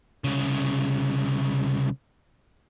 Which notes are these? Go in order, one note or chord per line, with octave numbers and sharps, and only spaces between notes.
C2 C#3